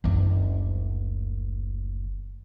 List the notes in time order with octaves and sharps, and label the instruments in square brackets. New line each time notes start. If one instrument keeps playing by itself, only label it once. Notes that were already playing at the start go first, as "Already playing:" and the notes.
[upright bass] F#1 D2